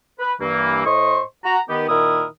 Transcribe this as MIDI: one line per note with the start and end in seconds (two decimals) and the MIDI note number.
0.19 0.34 71
0.41 0.85 43
0.41 0.85 52
0.41 0.85 58
0.86 1.22 45
0.86 1.22 72
0.86 1.22 75
0.86 1.22 84
0.86 1.22 85
1.45 1.60 66
1.45 1.60 82
1.69 1.87 51
1.69 1.87 59
1.69 1.87 67
1.89 2.25 46
1.89 2.25 51
1.89 2.25 64
1.89 2.25 70
1.89 2.25 87